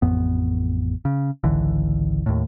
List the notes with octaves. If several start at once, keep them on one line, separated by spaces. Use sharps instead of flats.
A1 F2 B3
C#3
G#1 C#2 D3 E3
D#2 A2